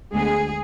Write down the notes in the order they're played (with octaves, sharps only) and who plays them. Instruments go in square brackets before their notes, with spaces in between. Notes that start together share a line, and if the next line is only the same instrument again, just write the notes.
[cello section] D2 D3 G#3 B3 G#4